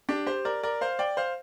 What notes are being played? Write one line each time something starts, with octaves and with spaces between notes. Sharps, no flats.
D4 G4
G4 C5
A#4 D5
A#4 D5
C5 F5
D5 G5
C5 F5